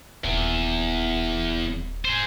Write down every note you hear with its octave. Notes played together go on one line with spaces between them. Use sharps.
D#1 E2
G#4 C5